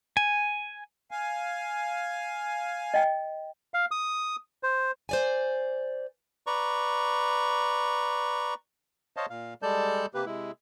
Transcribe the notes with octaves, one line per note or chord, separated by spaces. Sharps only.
G#5
F5 G#5
D#5 G5
F5
D#6
C5
C5 D5 G#5
B4 D5 A#5 C#6
C5 C#5 D#5 F5 A5
A#2 F5
G3 G#3 A4 D5 A5 G6
C3 A#3 G4 B4
C3 G#3 E4